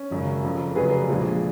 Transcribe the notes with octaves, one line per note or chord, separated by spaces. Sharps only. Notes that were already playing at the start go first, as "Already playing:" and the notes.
Already playing: C#4
G#1 F#2 C#3 F#3
F#1 F2 F3
F1 F2 C#3 F#3 G#4 B4
A#1 A#2 F3 G#3